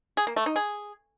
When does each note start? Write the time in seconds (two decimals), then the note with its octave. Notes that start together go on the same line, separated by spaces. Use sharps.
0.17 G#4
0.27 A#3
0.36 A3
0.46 D#4
0.56 G#4